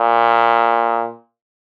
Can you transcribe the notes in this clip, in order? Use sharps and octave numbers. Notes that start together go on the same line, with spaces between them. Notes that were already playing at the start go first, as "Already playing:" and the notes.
Already playing: A#2